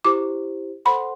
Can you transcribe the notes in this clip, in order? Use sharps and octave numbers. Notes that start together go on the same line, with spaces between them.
E4 G4 C5 D6
A4 C5 F#5 B5 C6